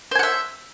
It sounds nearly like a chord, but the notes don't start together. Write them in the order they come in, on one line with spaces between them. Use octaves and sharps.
C5 G#5 F#5 E5